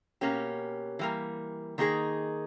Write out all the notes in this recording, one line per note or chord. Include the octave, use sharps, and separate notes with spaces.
B2 A#3 C#4 G4
E3 G3 A#3
D#3 A#3 D#4 G#4